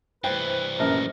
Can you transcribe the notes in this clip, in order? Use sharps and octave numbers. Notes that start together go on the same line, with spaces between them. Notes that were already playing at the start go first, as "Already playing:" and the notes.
G2 E3 B4 C5 G5
A#1 F#2 A#4